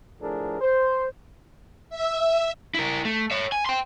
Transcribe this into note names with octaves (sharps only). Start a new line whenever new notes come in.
A2 F3 D4 G#4 A#4
C5
E5
E4 A#4
A3
C#5 E5
G#5
G5 C6